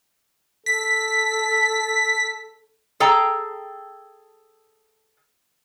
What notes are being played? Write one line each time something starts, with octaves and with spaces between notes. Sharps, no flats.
A4 B6
G#4 A4 G5 A#5